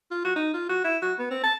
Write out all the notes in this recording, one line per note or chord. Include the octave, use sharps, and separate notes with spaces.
F4
F#4
D#4
F4
F#4
E4
F#4
B3
C4
A5